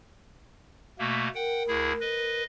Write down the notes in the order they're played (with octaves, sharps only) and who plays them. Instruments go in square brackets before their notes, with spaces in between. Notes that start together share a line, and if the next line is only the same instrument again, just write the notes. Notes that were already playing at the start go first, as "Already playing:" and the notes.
[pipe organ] B2 A3 A#3
[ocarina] A#4 [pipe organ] F#5 G5
[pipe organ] D2 E4 G#4
B4 D#5